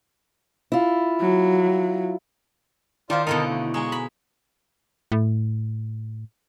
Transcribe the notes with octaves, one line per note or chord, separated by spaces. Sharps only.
E4 F4
F#3
D#3 E4 F4 C5 D5 F5
B2 D3 D#4 A#4 D#5 A5
A3
G#3 G#5 A#5 C#6 D#6
B5
A2